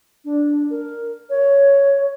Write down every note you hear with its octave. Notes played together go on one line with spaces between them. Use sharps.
D4
A#4
C#5